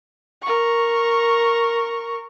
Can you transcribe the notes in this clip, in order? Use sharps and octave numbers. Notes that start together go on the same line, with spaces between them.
A#4 C#6